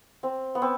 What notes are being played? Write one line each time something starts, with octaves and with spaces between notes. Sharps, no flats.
C4
B3
C4